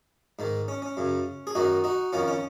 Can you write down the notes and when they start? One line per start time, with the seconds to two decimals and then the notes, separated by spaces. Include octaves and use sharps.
0.39 G#2 D#3
0.68 C#4
0.82 C#4
0.97 F#2 C#3
1.47 G#4
1.55 F#2 D#3 D#4 F#4
1.84 D#4 F#4
2.13 F2 D#3 C#4 F4
2.28 C#4